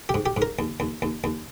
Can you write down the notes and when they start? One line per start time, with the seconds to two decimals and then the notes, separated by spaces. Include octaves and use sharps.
0.09 G4
0.14 G#2
0.26 G4
0.37 G#2
0.42 A#4
0.59 D#2
0.80 D#2
1.02 D#2
1.24 D#2